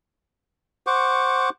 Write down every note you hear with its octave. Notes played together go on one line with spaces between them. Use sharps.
C5 F#5 C#6 D6